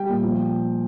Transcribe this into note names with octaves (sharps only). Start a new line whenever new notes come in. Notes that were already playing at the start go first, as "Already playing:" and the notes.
Already playing: G3 G5
A#2
F3